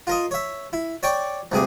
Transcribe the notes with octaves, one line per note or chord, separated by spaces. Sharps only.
F4 A#4 D#5
C#5 E5
E4
C#5 D5 G5 C#6 D6
D2 G2 C3 G#4 D6